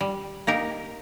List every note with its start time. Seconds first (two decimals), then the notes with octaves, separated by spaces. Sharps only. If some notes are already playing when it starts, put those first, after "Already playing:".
0.01 G3
0.47 A#3 D#4 G4 A#4